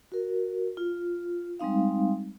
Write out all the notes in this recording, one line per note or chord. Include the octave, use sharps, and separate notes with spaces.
F#4 A#4
F4
G3 G#3 C4 D#4 F5